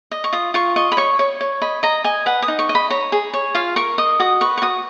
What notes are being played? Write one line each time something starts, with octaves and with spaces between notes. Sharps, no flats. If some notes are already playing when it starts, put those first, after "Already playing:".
D#5
C#6
F4 D#6
F4 C#6
D#5 C#6
B5
C#5 C#6
C#5
C#5
D#5 B5
D#5 A#5
D#5 G#5
B4 F#5
D#6
D#4
C#6
D#5
B5
C#5 A#5
G#4
C#5
F4 F5
A#4 C#6
D#5 D#6
F#4 D#6
B4 C#6
C#6
F#4 D#6